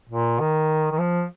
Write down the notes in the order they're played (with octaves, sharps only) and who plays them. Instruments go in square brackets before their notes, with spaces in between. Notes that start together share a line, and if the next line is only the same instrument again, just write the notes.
[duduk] A#2
D#3
D#3
F3